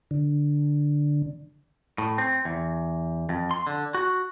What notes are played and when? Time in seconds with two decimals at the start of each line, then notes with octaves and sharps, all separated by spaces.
0.11 D3
1.98 A2
2.18 C4
2.45 E2
3.29 F2
3.51 C6
3.67 D3
3.94 F#4